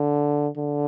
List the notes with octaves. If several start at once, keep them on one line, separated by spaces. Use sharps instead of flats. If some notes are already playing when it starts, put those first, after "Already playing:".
Already playing: D3
D3